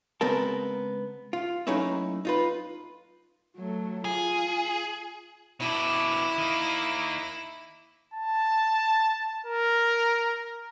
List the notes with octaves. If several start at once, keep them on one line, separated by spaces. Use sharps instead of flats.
C#3 G#3 B3 C4 A#4 A5
F4
F#3 A3 A#3 C#4 D#4 E4
D#4 F4 B4
F#3 A3
F4 G#4
B2 D4 E4
D#3 A#3
A5
A#4